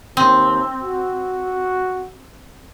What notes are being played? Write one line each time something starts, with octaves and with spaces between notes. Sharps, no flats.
D#2 C4
F#4